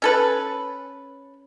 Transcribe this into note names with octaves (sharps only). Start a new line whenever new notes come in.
C#4 A4 B4